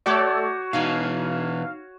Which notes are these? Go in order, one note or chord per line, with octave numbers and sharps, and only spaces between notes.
A3 F#4 A4 C#5 D5 D6 G6
B2 E3 D#4 F5